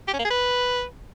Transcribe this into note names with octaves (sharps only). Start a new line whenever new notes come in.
G4
C#4
A#3
G#4
B4